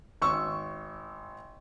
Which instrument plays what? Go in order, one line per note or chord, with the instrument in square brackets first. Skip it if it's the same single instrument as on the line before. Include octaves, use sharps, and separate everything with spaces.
[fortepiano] G#1 C#6 E6